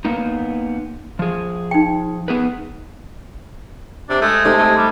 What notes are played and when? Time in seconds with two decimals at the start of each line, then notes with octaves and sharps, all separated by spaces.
0.05 A#3 B3 D#4
1.19 F3 G#4
1.71 D#4 G5
2.28 B3 G#4 B4
4.09 C3 D4
4.21 G#3 A3
4.45 C3 A3 D#4
4.58 C3
4.77 G3